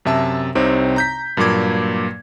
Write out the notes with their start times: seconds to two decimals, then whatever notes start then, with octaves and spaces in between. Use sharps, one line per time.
0.05 F#2 C3 E5 A5 E6
0.55 C2 C3 C4 D#4 C5 C#5
0.96 A#5 G6 B6
1.37 G2 A#2 F#3 A#3 D6 G#6